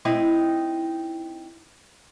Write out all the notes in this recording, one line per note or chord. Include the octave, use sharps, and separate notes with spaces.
C4 D#4 E4